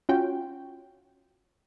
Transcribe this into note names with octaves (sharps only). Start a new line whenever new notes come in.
C#4 F4 F#4 G5